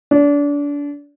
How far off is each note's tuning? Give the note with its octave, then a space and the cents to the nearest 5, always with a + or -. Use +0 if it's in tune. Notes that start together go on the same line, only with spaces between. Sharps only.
D4 -30